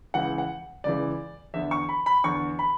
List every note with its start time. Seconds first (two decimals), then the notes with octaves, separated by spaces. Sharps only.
0.14 C#2 C#3 E3 F#5
0.38 F#5
0.84 C#2 C#3 E3 D5
1.54 E2 D3 E5
1.71 C#6
1.89 B5
2.06 B5
2.24 E2 D3 C#6
2.59 B5